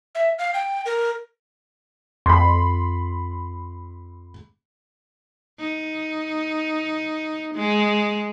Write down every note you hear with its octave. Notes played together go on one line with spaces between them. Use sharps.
E5
F5
G5
A#4
F2 B5 C6
D#4
G#3